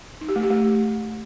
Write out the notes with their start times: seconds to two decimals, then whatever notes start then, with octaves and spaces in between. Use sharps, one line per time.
0.21 D#4
0.29 G4
0.36 A3
0.43 G4
0.50 A3